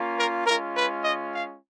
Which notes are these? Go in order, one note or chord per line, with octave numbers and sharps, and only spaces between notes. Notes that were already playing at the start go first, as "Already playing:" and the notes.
Already playing: A#3 C#4 F4
A#4
G#3 C#4 F4 A#4
B4
D#5
F5